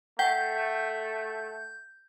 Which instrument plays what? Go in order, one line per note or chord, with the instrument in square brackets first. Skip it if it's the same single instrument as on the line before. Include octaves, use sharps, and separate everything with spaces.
[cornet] A3 [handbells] F#5 G5 [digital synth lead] G6